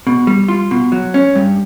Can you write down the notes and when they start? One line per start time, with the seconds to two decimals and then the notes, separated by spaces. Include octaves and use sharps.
0.07 B2
0.27 G3
0.48 F4
0.71 B2
0.92 F#3
1.14 C#4
1.35 G2